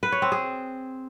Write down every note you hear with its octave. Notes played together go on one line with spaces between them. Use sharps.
B4
C#5
C4
G#4